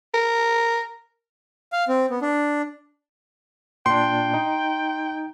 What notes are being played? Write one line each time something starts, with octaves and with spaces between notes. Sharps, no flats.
A#4
F5
C4
B3
D4
A#2 D4 G5 C6
D#4